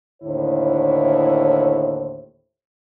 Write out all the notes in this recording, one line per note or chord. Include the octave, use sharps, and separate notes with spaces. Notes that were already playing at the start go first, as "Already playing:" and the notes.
D#2 A2 D3 E4 C5 C#5